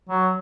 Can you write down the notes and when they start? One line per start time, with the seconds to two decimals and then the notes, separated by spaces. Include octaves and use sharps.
0.09 F#3